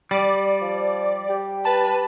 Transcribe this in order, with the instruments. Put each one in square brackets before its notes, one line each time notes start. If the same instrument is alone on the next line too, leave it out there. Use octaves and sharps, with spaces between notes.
[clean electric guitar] G3 [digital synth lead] D5
[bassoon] F3
G4
[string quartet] B4 [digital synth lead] A5